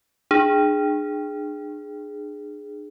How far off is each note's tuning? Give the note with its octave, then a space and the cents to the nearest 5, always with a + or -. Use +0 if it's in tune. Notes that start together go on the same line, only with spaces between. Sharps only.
D4 +35 G#4 +0